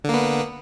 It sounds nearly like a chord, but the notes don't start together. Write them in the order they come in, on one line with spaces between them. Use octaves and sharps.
D3 A#3 B3